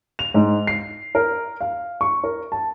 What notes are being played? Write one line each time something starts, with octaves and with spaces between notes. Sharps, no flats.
F7
G#2
C7
A#4
F5
C#6
A#4
A5